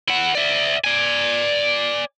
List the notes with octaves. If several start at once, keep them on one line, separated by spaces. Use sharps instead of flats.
E4 F#5
D5 E5
D5 G#5